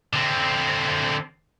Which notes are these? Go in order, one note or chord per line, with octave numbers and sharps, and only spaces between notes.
D3 C4